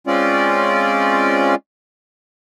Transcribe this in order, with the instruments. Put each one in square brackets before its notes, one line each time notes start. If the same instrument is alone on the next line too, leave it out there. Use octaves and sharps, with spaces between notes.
[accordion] G#3 C4 C#4 F4 D5